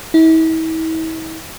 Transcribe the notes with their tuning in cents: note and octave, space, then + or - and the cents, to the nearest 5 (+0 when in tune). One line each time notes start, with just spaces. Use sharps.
E4 -40